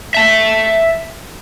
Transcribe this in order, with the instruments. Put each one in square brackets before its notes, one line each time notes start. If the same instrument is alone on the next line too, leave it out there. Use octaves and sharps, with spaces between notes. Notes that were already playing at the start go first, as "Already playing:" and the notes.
[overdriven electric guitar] E5 A5